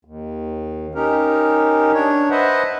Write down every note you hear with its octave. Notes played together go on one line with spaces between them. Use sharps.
D#2
C#4 D#4 G4 A#4
D4 C#5
B4 C5 D#5 E5 F#5